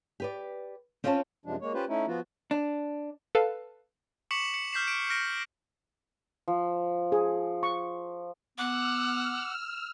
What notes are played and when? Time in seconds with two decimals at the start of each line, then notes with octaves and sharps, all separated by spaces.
0.20 G4 B4 D5
1.04 C4 C#4 F4 C#5 D#5 A5
1.45 F#2 C3 F3 G#3 D4
1.61 G#3 A#3 C#5
1.74 C#4 F4 G4 B4 C5
1.88 A3 C#4 D#4 E4
2.07 F3 B3 F4 F#4
2.51 D4
3.35 A4 B4 F5 A5
4.31 C#6 D6 B6 C#7 E7 F#7
4.54 C#7
4.73 F6 G6 B6 C7 E7
4.88 D7
5.10 F6 A#6 D7
6.48 F3
7.12 G#4
7.63 C#6
8.58 B3 F#5 D6 E6 F6